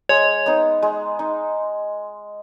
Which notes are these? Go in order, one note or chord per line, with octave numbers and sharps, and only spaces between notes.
G#3 C#5
B3 D#4
G#3
D#4